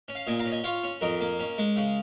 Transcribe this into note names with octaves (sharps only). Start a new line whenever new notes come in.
C#4
F5
A#2 D#5 G#5
F5 A#5
C#4
D#5 G#5
F4 C#5 F5
C#4
F2 A#4 D#5
A#3
C#4
G#3
C#3